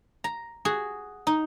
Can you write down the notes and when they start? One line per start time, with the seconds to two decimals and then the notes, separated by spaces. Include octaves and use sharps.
0.24 A#5
0.65 F#4 G#4
1.27 D#4